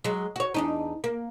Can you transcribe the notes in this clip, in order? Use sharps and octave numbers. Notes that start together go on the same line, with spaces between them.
F#3 G#3
F#4 C#5
E2 D4 D#4
A#3